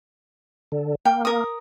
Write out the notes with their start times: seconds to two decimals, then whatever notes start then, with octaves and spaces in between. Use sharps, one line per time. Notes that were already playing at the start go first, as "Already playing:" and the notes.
0.72 D3
1.05 A#3 G5
1.25 A#4 D#6